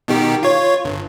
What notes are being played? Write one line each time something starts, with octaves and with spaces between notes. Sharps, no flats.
B2 D#3 G4
F4 C#5
G1